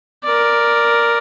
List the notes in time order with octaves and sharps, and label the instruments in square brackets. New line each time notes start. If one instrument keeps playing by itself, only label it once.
[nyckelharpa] A#4 D5